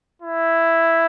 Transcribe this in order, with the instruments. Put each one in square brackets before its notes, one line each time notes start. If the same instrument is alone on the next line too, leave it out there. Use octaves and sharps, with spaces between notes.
[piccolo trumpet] E4